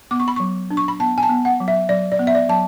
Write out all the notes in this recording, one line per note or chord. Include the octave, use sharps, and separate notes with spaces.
B3 D6
C#6
B5
F#3 C#6
D4
C#6
B5
B3 A5
G#5
A5
B3
F#5
F#3
E5
F#3 D5
D5
B3
E5
D5
F#3 A5